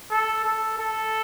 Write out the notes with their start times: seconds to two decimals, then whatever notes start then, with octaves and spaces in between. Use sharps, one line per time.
0.11 A4
0.45 A4
0.78 A4